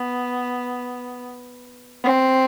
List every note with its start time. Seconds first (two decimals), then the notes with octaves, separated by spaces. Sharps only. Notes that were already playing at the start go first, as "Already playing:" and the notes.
Already playing: B3
2.04 C4